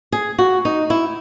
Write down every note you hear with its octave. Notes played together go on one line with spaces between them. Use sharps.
G#4
F#4
D#4
E4